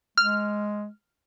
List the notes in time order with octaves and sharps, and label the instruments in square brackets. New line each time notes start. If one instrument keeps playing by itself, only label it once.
[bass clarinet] G#3 [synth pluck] F6